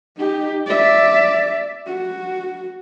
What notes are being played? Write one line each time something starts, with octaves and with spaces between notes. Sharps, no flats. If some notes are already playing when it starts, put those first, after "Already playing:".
D#4 G4
D5 E5
F#4